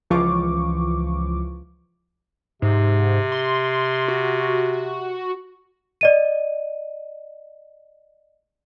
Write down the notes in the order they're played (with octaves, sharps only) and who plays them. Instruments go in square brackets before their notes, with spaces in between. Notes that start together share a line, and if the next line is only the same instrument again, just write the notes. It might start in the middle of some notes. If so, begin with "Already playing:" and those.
[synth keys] C#2 E3 F3 F4 C#6 D6
[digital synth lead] G#2 [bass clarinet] C3
[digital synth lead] C6
F#4
[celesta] D5 D#5 D#7